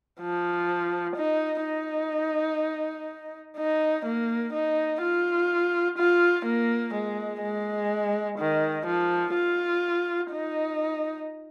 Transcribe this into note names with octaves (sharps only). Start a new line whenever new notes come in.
F3
D#4
D#4
D#4
A#3
D#4
F4
F4
A#3
G#3
G#3
D#3
F3
F4
D#4